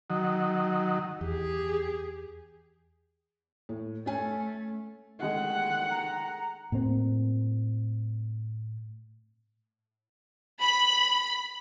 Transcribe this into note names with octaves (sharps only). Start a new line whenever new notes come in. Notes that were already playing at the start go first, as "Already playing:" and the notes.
D#3 F#3
E2 G4 G#4
A2
A3 C#4 G#5
D#3 G#3 A3 F#5
A#5
A2 A#3 C4
B5